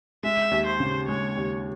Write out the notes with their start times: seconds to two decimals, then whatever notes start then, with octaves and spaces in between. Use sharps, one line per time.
0.23 G#3 E5
0.51 D#2
0.66 C5
0.80 C#3
1.08 G#3 C#5
1.37 D#2